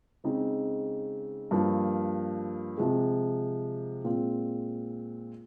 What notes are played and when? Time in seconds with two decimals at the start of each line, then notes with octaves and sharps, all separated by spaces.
0.24 C#3 G#3 C4 D#4
1.51 G2 F3 A#3 F4
2.77 C3 F3 G#3
4.04 A#2 G#3 C4 F4